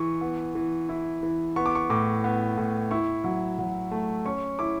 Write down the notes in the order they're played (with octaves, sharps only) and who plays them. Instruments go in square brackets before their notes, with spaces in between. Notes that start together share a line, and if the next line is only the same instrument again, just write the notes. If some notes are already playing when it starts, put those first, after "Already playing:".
Already playing: [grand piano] E3 C#6
B3
E3
E4
E3
B3 C#6
D6
C#6
A2 D6
B3
A2
E4 C#6
F#3
F#3
A3
C#4 C#6
E4 D6